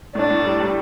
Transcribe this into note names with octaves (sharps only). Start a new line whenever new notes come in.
A2 D4
A2
G3
G3